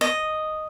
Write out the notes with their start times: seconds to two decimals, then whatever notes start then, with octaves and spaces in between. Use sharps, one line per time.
0.01 D#5